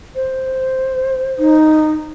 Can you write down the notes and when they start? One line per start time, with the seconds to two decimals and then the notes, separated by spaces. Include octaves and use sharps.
0.15 C5
1.39 D#4